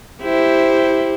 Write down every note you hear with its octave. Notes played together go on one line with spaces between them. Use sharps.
E4 G4 C5